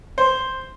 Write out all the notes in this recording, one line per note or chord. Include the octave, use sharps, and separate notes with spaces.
C5